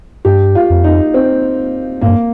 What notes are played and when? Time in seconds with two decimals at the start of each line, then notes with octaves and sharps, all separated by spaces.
0.25 G2 G4
0.55 F4
0.70 F2
0.84 D#4
1.14 C4
2.01 G#2 A#3
2.09 G2